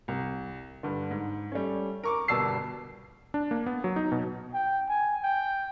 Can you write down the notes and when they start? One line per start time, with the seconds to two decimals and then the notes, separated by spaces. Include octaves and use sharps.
0.08 C2
0.83 G2 D3
1.11 G#2
1.52 G3 A3 C#4
2.04 A#4 C#6 D6
2.28 G1 B2 G3 A5 E6 C7
3.34 D4
3.51 A#3
3.66 B3
3.84 F#3
3.96 D#4
4.12 B2
4.54 G5
4.89 G#5
5.23 G5